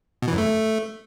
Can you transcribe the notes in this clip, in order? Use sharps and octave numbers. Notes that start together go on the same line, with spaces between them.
B2
E3
F#2
A3